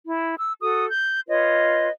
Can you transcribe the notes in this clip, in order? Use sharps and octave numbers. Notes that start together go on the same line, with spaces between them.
E4
E6
F#4 A4 D#6
G6
F4 B4 C#5 D#5